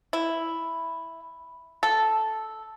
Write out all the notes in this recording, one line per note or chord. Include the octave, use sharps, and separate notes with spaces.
E4
A4